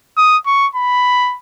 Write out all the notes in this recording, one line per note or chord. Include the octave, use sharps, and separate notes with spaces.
D#6
C#6
B5